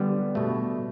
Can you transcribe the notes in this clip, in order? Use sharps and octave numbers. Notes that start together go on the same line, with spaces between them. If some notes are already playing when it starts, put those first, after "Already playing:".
Already playing: D3 G3 B3
B2 A3